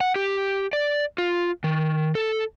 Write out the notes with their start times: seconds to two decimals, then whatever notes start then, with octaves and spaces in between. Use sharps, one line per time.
0.01 F#5
0.16 G4
0.73 D5
1.18 F4
1.64 D#3
2.15 A4